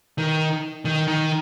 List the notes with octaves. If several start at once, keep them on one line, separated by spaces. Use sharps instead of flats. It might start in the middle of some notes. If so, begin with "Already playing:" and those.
D#3
D#3
D#3